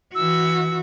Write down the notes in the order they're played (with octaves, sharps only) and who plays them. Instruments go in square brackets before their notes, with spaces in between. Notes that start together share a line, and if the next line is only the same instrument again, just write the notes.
[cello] E3 F#4 [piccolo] E6